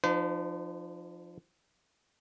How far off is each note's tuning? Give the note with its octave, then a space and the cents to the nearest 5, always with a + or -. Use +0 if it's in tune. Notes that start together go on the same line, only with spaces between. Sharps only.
F3 +0 D#4 -45 C5 -45